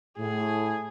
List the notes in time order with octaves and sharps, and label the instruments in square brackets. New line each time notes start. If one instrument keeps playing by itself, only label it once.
[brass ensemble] A2 [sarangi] G#4